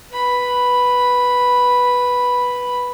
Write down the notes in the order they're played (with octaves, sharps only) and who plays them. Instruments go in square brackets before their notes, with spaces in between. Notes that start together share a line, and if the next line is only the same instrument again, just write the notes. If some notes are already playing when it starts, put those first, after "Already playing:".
[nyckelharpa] B4 B5